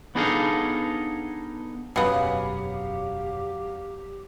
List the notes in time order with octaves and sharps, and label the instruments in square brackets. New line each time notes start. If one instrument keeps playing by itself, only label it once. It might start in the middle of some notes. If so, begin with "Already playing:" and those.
[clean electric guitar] B3 D4 D#4 G#4 A4 F5
[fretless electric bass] E1 F#2 [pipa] C#3 B3 [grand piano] F#3 F5 C#7 [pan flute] G4